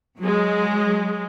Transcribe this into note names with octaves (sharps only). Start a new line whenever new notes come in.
F#3 G#3